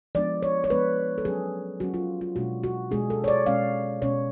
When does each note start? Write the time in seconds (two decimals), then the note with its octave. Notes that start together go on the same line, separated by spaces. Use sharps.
0.15 F3 G#3 B3 D4 D5
0.43 C#5
0.64 C#5
0.70 F3 G#3 B3 D4 B4
1.18 A4
1.25 F#3 C#4 G#4
1.80 F#3 C#4 F#4
1.94 F4
2.21 F4
2.36 B2 G#3 D4 F#4
2.63 F#4
2.91 B2 G#3 D4 G#4
3.10 A4
3.24 C#5
3.28 D5
3.46 B2 G#3 C#4 F5
4.02 B2 G#3 C#4 C#5